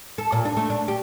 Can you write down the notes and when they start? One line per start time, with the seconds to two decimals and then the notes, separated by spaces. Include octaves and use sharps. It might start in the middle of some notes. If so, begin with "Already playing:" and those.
0.18 A4
0.32 A#2
0.45 D4
0.57 A3
0.70 D4
0.88 G4